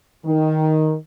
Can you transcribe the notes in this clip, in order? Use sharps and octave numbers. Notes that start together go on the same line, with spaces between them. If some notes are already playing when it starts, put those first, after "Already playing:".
D#3